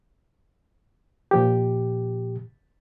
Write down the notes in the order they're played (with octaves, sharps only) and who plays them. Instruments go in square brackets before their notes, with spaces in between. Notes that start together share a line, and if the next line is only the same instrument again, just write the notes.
[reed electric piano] A#2 F3 G4